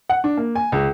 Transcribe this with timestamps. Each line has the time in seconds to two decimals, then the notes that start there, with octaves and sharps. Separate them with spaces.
0.10 F#5
0.24 D4
0.37 A#3
0.55 G#5
0.72 C#2